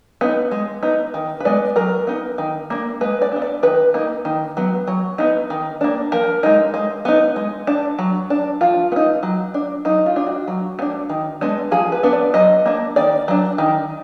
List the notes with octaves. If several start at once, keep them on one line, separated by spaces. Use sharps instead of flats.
B3 D#4
G#3
B3 D#4
D#3
B4
G#3 B3 D5
F#3 A#4
B3 D#4
D#3
A#3 D4
G#3 B4
D5
B3 D4
D5
D#3 B4
A#3 D#4
D#3
F#3 B3
F#3
B3 D#4
D#3
A#3 D4
F3 A#4
G#3 D#4
G#3
B3 D#4
G#3
D4
F#3
D4
F3 F4
B3
D#4
F#3
D4
F#3 D#4
F4
D4
F#4
F#3
B3
D4
D#3
G#3 B3 D4
F3 G#4
B4
B3 D4
D5
F#3 D#5
A#3 D4
D#3 D5
F#3 D4
D#3